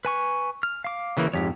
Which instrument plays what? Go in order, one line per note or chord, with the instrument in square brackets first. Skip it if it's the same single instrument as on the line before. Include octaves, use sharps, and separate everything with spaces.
[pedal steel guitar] B4 G#5 C#6
F6
F5 D6
[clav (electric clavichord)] C#3 E3 A#3
[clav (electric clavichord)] F2 G#2 [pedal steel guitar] G4 C#5